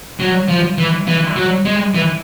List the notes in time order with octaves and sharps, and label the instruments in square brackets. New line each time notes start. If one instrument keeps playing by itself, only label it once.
[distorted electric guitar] F#3
F3
E3
E3
F#3
G#3
E3